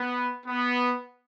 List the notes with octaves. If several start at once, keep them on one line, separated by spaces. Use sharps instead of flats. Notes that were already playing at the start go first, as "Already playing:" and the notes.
Already playing: B3
B3